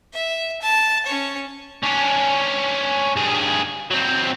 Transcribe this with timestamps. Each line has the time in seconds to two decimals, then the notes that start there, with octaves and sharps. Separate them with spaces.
0.13 E5
0.62 A5
1.06 C#4 C#5
1.83 C#4 D4
3.16 G2 G#4
3.91 F#3 C4